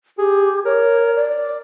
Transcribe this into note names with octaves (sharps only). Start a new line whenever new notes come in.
G4 G#4
A#4 C#5
D5